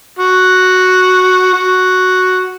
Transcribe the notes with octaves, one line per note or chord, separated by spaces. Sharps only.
F#4
F#4